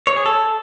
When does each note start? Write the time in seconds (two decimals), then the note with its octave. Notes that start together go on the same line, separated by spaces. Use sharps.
0.07 C#5
0.16 G#4
0.26 A4